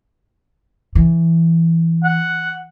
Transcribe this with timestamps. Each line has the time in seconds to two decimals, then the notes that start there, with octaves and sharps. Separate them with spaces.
0.95 E3
2.04 F#5